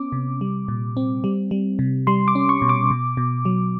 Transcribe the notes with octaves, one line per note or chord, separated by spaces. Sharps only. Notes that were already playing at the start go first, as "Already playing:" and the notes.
Already playing: B3 C#4 D6
C3
G3
A#2
C4
G3
G3
C3
G3 C6
D6
C#4
C#6
B2
D6
B2
B2
F#3